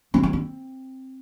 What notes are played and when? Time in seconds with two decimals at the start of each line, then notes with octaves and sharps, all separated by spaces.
0.14 C4
0.23 D#4
0.33 C4